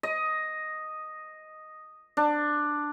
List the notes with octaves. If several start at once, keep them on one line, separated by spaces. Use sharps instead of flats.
D#5
D4